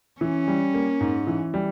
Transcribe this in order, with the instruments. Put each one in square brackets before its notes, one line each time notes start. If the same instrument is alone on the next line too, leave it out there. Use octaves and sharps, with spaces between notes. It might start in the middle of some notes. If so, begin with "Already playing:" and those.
[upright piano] E3 [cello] C#4
[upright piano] G3
A#3
G#2
E3
G3